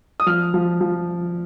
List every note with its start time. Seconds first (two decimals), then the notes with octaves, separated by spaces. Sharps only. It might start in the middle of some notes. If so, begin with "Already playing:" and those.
0.20 D#6
0.26 F3 F6
0.54 F3
0.81 F3